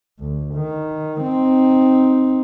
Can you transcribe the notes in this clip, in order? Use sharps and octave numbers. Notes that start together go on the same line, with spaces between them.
D2
D#3
C4 D#4